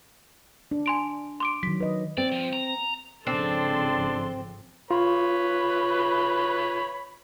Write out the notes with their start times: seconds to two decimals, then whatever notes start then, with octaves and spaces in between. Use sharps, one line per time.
0.71 D4
0.86 G#5 C6 D7
1.40 C6 D6 D7
1.63 D#3 F#3 B6
1.80 B4 D#5
2.18 C4 D5
2.32 F3
2.53 A#5
3.27 G#1 C#3 F3 C4 D4 A4 C6
4.91 F4 B4 C#5 B5